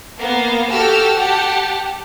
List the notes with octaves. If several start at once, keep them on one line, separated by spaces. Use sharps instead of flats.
A#3 B3 F5
F#4 G4 A4 A5 E6 F6
G4 F#5 A5